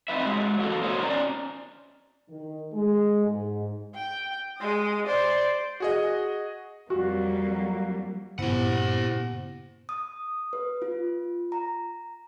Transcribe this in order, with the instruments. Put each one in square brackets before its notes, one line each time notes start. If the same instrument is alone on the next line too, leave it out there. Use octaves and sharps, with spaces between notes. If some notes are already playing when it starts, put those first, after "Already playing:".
[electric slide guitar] C4 D#4 F4 B4 E5
F#3 G#3
A#3 F#4 A4
F#4 A#4 C5 C#5 D#5
C#4 D4 D5 A#5
[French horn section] D#3
G#3
G#2
[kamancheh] G5
G#3 D#6
C5 D5
[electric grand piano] F#4 G#4 D#5
[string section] F2 F#3 [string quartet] G3 A#3 [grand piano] F#4
[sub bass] G2 [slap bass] A#2 C#3 [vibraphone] B3 E4 C5 [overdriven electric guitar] G4 F#5
[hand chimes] D#6
B4
F4
A#5